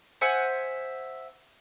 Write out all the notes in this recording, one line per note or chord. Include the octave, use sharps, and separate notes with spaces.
C5 E5 F#5 G#5